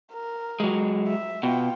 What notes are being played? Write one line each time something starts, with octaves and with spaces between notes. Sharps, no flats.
A#4
F#3 G#3
E5
B2 F4 G5